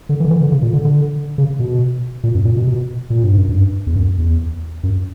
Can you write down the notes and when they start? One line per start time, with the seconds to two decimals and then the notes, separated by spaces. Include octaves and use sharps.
0.09 D3
0.20 E3
0.25 D3
0.31 E3
0.41 D3
0.52 C#3
0.62 A#2
0.73 D3
0.85 D3
1.38 C#3
1.60 B2
2.24 A#2
2.35 F#2
2.45 A#2
2.57 B2
2.67 B2
3.10 A#2
3.24 G2
3.37 F#2
3.49 G2
3.87 E2
3.96 F#2
4.18 E2
4.83 F#2